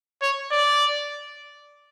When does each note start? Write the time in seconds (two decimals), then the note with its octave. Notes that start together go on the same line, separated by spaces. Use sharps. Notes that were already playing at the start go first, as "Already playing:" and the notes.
0.22 C#5
0.52 D5